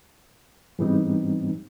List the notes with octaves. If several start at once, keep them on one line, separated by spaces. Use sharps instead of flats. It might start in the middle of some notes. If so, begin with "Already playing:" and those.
G#2 E3 G3 B3 C4 D#4